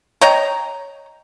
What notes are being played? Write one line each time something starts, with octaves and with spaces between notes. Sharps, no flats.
C#5 D#5 G5 A#5